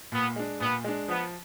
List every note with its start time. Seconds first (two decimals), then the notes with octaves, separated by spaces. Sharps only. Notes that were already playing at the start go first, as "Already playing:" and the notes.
0.12 A#2 B3
0.36 G#3 D4
0.60 A#2 B3
0.84 G#3 D4
1.08 F3 B3